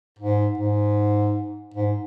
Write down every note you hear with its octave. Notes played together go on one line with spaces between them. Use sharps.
G#2
G#2
G#2